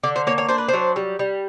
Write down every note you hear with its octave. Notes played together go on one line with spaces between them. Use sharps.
D3 D5
C5
A#3 C#5
C#5
D4 C5
B4
F#3 C5
G3
G3